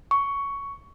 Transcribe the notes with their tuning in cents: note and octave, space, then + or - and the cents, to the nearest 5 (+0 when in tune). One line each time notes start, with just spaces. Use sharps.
C#6 +10